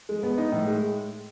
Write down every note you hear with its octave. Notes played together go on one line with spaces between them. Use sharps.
G#3
B3
D#4
A2
G#3